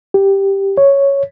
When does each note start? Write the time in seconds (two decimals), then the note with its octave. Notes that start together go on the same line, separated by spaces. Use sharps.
0.14 G4
0.77 C#5